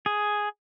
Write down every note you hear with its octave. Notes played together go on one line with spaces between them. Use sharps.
G#4